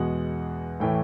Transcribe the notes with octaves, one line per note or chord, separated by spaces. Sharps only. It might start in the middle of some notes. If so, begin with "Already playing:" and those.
Already playing: E2 B2 G#3 F#5
A2 E3 A3 G5